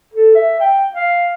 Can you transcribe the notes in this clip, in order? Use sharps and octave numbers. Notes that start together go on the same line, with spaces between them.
A4
E5
G5
F5